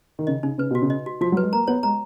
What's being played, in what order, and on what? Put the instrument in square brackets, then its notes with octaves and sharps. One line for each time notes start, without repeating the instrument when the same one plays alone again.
[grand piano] D#3
[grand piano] C#3 [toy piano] D#5
[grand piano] C#3 [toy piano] D#4
[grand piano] C#3 [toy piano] B4
[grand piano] B2 [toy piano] F#4
[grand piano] C#3
[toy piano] D#5
F#4
[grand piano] F3 [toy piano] F#4
[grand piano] F#3
[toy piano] B4
[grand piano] G#3
[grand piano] A#3 [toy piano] A#5
[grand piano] B3 [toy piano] C#5
[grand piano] G#3 [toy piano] A#5